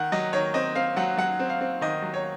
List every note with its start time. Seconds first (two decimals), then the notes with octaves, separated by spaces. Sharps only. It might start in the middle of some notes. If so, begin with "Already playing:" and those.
Already playing: D#3 F#5
0.12 F#3 D#5
0.33 D#3 C#5
0.54 C4 D#5
0.75 C4 F5
0.96 F#3 F#5
1.17 F#3 F#5
1.40 C4
1.49 F5
1.61 C4
1.81 D#3 D#5
2.02 F#3
2.14 C#5